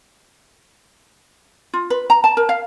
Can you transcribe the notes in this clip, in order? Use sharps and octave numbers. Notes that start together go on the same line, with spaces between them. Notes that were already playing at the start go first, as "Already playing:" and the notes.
F4
B4
A#5
A5
A#4
F5